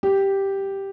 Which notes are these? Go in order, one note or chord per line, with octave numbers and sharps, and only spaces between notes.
G4